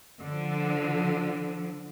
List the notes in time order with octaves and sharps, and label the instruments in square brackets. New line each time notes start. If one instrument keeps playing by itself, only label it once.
[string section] D3 F3